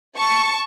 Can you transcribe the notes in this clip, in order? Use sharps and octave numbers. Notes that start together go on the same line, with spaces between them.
A5 C#6